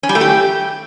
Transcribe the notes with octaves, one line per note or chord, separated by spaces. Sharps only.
C#4
G3
A3
G4